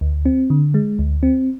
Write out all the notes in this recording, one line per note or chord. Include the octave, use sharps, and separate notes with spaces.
D2
C4
D3
G#3
D2
C4